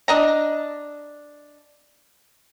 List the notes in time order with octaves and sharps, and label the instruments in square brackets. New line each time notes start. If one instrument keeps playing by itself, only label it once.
[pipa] D4 D#5 A#5